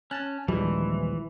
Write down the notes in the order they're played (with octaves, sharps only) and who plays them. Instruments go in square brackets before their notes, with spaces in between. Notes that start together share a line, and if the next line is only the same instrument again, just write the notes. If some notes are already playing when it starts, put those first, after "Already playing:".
[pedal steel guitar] C#4 [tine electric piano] G#5 A5 F#6
[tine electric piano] A#1 G#3 [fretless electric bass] D#2 F3 G3 [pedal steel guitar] E3